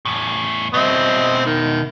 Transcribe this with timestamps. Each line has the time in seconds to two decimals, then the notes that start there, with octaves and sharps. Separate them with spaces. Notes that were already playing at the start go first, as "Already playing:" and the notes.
0.05 E2 A2
0.74 B2 C4 D#5 E5
1.46 D#3